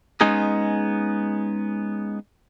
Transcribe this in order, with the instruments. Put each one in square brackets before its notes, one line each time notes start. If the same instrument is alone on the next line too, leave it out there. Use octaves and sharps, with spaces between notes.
[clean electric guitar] G#3 B3 C#4 D#4 G#4